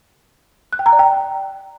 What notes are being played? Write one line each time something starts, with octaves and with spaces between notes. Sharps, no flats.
F#6
G5
A#5
D5
G5